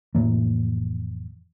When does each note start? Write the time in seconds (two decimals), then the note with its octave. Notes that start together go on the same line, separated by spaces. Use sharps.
0.15 F1 A2 E3 A#3